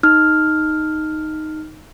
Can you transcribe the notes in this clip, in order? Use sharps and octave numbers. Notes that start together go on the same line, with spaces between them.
D#4 F6